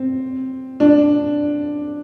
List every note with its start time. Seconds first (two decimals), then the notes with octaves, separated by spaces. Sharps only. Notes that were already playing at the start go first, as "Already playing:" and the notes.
Already playing: C4
0.80 D4